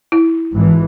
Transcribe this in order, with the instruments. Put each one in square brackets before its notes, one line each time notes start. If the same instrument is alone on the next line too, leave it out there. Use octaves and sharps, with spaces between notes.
[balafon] E4
[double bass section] G#1 E3